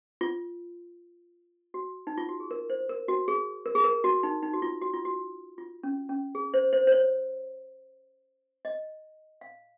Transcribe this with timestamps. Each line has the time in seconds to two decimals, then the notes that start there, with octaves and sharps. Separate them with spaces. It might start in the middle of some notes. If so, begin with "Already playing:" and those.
0.21 F4
1.74 F#4
2.07 D#4
2.18 F4
2.29 F#4
2.40 G#4
2.51 A#4
2.70 C5
2.89 A#4
3.08 F#4
3.28 G#4
3.66 A#4
3.75 G#4
3.84 A#4
4.04 F#4
4.23 D#4
4.43 D#4
4.53 F#4
4.62 F4
4.81 F#4
4.93 F4
5.05 F#4
5.58 F4
5.83 C#4
6.09 C#4
6.35 G#4
6.54 C5
6.73 C5
6.87 C5
6.92 C#5
8.65 D#5
9.41 F5